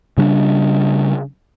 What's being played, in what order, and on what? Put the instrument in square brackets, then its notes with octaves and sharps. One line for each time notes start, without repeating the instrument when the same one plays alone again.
[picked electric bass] C#3 G3 D4